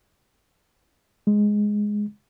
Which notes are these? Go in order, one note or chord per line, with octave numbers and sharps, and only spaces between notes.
G#3